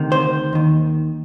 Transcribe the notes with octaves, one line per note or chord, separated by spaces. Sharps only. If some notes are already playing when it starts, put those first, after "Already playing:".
Already playing: D2 C3 D#3
C5
D#2 D#3